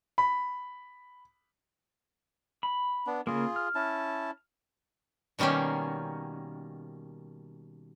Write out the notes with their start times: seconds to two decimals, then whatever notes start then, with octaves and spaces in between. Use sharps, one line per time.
0.18 B5
2.63 B5
3.07 B3 D4
3.27 C#3 A#3 F4 G#4
3.56 F6
3.75 C#4 E4 A5
5.39 B2 D#3 G3 A#3 C#4